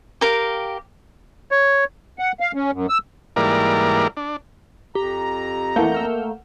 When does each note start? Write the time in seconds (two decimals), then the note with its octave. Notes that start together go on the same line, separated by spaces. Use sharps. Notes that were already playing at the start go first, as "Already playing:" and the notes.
0.21 G4 A#4 F5
1.51 C#5
2.19 F#5
2.40 F5
2.55 C#4
2.72 F#2
2.89 E6
3.36 G#2 E3 G3 A#3 A#4 D5
4.17 D4
4.95 F2 G4 A#5
5.76 E3 A3 A#3 F#5 G6
5.92 E6 F6 G6